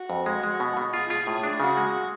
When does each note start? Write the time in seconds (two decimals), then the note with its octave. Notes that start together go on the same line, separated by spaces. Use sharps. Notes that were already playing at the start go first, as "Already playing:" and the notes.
Already playing: F#4
0.10 F2
0.26 G#3
0.43 G#3
0.60 B2
0.77 B2
0.93 F4 G#4
1.10 F4
1.27 A2
1.43 D4
1.60 C#3 F#4
1.77 G#3